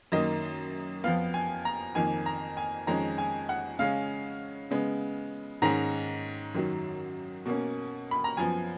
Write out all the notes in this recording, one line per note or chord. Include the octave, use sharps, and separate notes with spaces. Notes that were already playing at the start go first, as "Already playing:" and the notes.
F#2 D#3 A#3 D#5
F2 F3 B3 F5
G#5
A#5
F2 D#3 A#3 G#5
A#5
G#5
F2 D#3 G#3 C#4 A#5
G#5
F#5
C#3 G#3 C#4 F5
C#3 G#3 B3
G#2 D#3 G#3 C#4 A#5
F#2 D#3 F#3
B2 A#3 C#4
B5
A#5
F#2 F3 B3 G#5